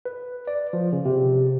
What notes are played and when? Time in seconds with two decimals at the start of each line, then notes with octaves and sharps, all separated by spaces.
0.05 B4
0.47 D5
0.73 F3
0.93 C#3
1.05 C3